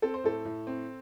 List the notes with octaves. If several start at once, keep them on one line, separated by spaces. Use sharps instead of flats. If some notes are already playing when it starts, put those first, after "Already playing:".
C4 A4
C5
A2 A4
A2
C4